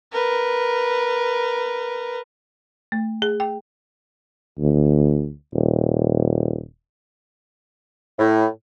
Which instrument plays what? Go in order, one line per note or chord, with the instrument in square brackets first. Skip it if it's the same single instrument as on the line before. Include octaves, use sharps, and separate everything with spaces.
[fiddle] A#4 B4
[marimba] A3
G#4
G5
[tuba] D2
D#1
[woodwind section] A2